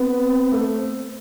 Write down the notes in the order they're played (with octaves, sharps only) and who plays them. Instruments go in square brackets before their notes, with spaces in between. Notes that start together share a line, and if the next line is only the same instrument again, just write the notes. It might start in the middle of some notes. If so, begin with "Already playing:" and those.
Already playing: [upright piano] B3 [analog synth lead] C4
[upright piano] A3